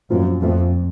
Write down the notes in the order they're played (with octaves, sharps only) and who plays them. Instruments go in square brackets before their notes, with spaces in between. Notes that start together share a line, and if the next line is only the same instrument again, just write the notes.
[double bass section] F#2 [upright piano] A#2 F3 A3 C4 F4
[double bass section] F2 [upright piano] A#2 F3 A3 C4 F4